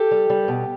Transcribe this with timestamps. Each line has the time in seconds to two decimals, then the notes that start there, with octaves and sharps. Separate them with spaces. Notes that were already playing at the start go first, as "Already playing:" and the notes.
Already playing: G4 A4
0.11 G3
0.30 G3
0.48 B2